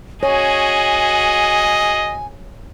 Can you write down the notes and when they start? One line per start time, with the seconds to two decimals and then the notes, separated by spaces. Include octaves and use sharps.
0.23 F#4 G#4 C#5 D#5 G#5